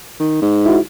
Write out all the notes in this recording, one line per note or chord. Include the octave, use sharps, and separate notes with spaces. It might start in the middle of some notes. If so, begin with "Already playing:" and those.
D#3
G#2
E4 F#4